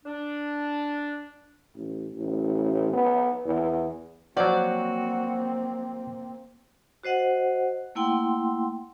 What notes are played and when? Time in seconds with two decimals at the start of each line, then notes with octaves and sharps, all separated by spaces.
0.05 D4
1.76 A1
2.15 A1
2.93 B3
3.46 E2
4.37 F3 F#3 A#3 C4 F#4 D5
7.04 F#4 C5 D#5 F#5
7.95 A3 A#3 E4 F#5 G5 C6